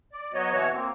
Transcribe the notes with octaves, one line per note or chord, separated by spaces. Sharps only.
D5
F#3 B3 F#4 C#5 D#5
B2 E3 F#4 C#5
A#3 C4